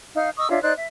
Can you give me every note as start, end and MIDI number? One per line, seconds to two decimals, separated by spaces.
0.15 0.29 63
0.15 0.29 77
0.15 0.29 89
0.37 0.48 75
0.37 0.48 85
0.37 0.48 87
0.37 0.48 88
0.49 0.62 62
0.49 0.62 65
0.49 0.62 73
0.49 0.62 76
0.62 0.72 63
0.62 0.72 72
0.62 0.72 74
0.62 0.72 90
0.76 0.87 76